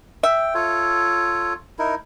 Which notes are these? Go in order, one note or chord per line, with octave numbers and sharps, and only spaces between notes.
E5 G5
F4 A4 C#5
D#4 E4 A#4